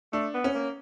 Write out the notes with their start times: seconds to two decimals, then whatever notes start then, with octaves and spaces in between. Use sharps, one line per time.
0.13 A3 D4
0.34 B3
0.44 C#4
0.55 A#3